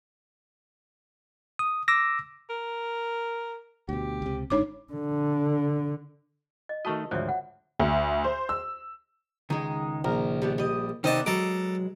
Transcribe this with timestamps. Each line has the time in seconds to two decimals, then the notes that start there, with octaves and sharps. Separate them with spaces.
1.59 D#6
1.88 D6 E6 A#6
2.50 A#4
3.89 D2 B2 G4
4.22 C#2 C3
4.50 G1 G#2 D4 D#4 C#5 D6
4.93 D3
6.69 D#5
6.85 D#3 A3 F#4 D#5 A5 C#6
7.11 G#1 D2 F3 C5 C#5 E5
7.29 F#5
7.79 D2
8.24 C5
8.49 E6
9.50 C#2 D#3 G#3 D#4
10.05 A#1 A#4
10.42 G3 B3 D4
10.58 G3 D#5
11.04 C3 D#3 B3 C4 D4 D#5 A5
11.26 F#3 G#3 A4 B4 A#5 D6